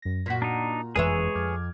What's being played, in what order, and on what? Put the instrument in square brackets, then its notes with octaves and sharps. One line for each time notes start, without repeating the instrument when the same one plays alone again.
[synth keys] F#2 A#6
[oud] A#2 F#4 [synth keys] A#6 B6
[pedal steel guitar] D4 D#4 [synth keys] A#5
[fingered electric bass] F#1 F2 E3 [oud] G#3 B4 E5 [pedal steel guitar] G#4 C#5
[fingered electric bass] F2 [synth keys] D6 F6 G#6